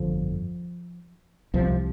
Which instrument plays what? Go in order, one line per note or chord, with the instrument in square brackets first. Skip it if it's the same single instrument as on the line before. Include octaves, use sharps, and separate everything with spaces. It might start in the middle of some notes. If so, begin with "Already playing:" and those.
Already playing: [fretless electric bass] G1 F2 D3 F3
C2 C3 F3